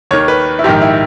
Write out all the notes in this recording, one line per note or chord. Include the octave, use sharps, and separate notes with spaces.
D#2 D#3 C#5
B4
E4
A#1 G#2 D#3 G4
E4